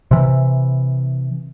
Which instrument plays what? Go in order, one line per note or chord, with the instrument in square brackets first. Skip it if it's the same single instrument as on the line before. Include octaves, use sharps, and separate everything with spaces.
[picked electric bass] C3 E3